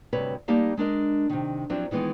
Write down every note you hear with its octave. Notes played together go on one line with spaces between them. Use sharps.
D2 G2 C3 B4 C#5
G3 A#3 D#4 G4 F5 A5
G#3 D4 A#4 D#5
C3 D#3
F3 F#3 C4 D4 E4
D#3 E3 G#3 B3 D#4